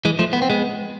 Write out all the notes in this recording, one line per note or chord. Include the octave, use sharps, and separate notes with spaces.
E3 G#3
F3 A3
B3
C4
G#3 B3